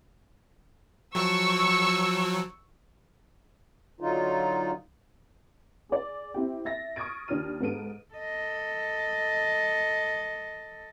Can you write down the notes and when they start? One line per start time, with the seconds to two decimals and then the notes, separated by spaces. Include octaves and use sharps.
1.15 F3 F#3 C#6 E6
4.00 D3 F#3 D#4 F4
5.89 G#4 D5
6.34 C4 E4 G4
6.65 E5 A6 A#6
6.96 C#6 D#6 F6 G#6 A6 D7
7.28 D#2 D4 F4 F6 D#7
7.60 G#2 B3 A4 D7 D#7
8.14 A4 D#5